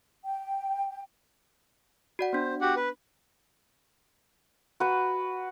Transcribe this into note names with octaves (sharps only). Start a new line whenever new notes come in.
G5
F#4 D5 F#5
B3 D4 C5
F#4 G4 F#5
B4
F#4 B4